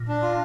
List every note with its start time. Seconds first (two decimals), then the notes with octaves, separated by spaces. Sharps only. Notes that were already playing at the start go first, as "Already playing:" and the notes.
Already playing: A#2
0.08 D4
0.22 F4